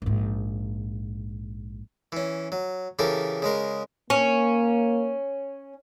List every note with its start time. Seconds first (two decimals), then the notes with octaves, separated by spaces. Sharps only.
0.02 A#1 G#2
2.12 E3 C#4
2.52 F#3
2.99 C#3 E3 G4 A4 A#4
3.42 C#3 G#3 A#4
4.10 A#3 C#4